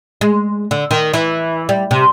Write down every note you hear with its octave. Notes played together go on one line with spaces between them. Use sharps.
G#3
D3
D#3
E3
G3
C3